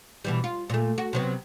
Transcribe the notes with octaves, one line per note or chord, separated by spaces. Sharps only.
B2 E3 G3
F4
A#2 A3
F#4
C3 F#3 B3